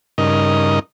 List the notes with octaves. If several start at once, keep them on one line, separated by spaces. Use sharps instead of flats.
G2 C#3 D#4 A#4 D#5